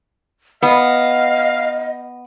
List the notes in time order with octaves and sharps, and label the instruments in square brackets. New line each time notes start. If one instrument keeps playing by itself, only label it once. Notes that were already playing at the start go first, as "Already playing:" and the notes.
[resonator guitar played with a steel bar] B3 [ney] D#5 [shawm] F5